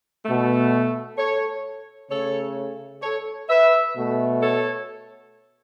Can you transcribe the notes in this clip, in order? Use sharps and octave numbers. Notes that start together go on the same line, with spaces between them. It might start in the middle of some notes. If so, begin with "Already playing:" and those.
B2 A3
A4 C#5
C#3 A3 A4 C#5
A4 C#5
B4 E5
B2 A3
A4 C#5